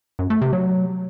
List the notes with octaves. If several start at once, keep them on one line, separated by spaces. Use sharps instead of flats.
F#2
A3
C3
F#3